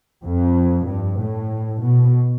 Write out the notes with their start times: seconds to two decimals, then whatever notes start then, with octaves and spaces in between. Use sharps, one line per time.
0.24 F2
0.88 G2
1.20 A2
1.81 B2